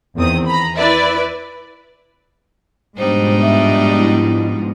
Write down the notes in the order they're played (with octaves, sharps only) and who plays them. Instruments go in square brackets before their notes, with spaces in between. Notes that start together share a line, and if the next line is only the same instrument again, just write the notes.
[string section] E2 D#3 C4 D#6
A#5 B5
E4 B4 D5 E5
[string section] G#2 B2 F3 [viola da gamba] G3 D4 D#4 [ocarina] C5
[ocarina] E5
E4